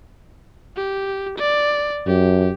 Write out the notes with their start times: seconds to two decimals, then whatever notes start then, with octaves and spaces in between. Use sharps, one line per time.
0.76 G4
1.38 D5
2.07 F#2 G4